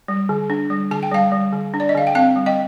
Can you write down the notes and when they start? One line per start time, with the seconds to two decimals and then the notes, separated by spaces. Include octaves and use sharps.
0.08 G3
0.29 D3
0.50 D4
0.70 G3
0.91 D3 A5
1.03 G5
1.12 G3 F5 A5
1.32 G3
1.53 D3
1.74 D4
1.80 D5
1.89 D#5
1.95 D3 F5
2.07 G5
2.15 C4 F5 A5
2.36 G3
2.46 D#5 G5